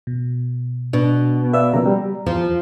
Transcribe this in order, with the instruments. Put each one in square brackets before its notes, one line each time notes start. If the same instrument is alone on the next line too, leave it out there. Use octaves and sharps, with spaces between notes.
[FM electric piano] B2
[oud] B2 [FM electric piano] D4
[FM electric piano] B4 D5 F5 [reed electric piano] E5 E6
[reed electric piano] C#3 F3 A#3 [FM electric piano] A#5
[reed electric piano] G3
[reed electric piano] E2 [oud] F3